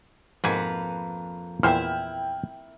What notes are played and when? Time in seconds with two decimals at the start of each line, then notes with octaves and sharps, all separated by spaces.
0.44 F2 G#2 B2 A#3 B4 G#5
1.63 E2 A#2 E4 C5 E5 G5 F6